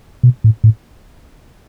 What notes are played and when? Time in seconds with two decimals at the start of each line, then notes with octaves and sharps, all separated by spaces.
0.23 B2
0.44 A2
0.64 A2